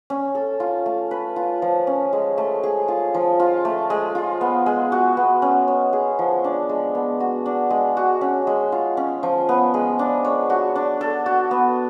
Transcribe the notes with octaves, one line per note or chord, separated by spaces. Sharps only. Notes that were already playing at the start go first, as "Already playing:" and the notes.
C#4
A4
F4
A3
B4
F4
F3
C#4
G#3
A3
G#4
F4
F3
F4
A3
G#3
F4
B3
G#3
F#4
B3
C#4
C#5
G#4
F3
D4
G#3
B3
F#4
D4
G#3
F#4
C#4
G#3
F4
C#4
F3
B3
G#3
D4
C#5
F#4
D4
A4
F#4
B3